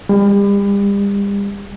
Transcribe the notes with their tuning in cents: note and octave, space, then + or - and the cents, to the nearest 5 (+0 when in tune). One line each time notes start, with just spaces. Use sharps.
G3 +40